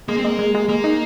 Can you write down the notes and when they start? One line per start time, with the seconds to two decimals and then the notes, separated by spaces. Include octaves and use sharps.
0.08 G#3 A#3
0.17 C4
0.24 G#3 A#3
0.39 G#3
0.55 G#3
0.69 G#3 A#3
0.84 D#4